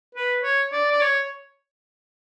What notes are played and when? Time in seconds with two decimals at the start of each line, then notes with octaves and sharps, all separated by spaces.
0.15 B4
0.43 C#5
0.72 D5
0.92 D5
1.01 C#5